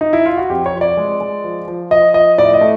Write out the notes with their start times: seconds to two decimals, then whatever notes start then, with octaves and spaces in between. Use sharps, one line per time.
0.01 D#4
0.13 E4
0.26 F4
0.37 F#4
0.50 F2 G4
0.66 C#5
0.74 F3
0.81 D5
0.97 G#3
1.21 G#3
1.44 F3
1.68 F3
1.91 F3 D#5
2.14 F3 D#5
2.38 A2 D5
2.54 D#5
2.61 A3